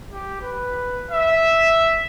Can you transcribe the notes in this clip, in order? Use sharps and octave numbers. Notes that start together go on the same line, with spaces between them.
G4
B4
E5